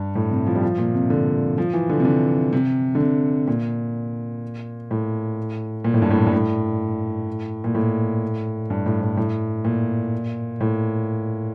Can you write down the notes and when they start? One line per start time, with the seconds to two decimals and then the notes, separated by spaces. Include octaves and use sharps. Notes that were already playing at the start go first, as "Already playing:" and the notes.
Already playing: G2
0.15 A2
0.31 C3
0.47 F3
0.55 G3
0.63 F3
0.78 A#2
0.94 C3
1.10 D3
1.58 F3
1.74 E3
1.90 D3
2.00 C3
2.05 D3
2.53 C3
2.95 D3
3.00 C3
3.47 A#2
4.91 A2
5.85 A#2
5.94 A2
6.02 G2
6.10 A2
6.27 G2
6.33 A2
7.64 A#2
7.75 A2
8.70 G2
8.86 A2
9.02 A2
9.17 A2
9.65 A#2
10.61 A2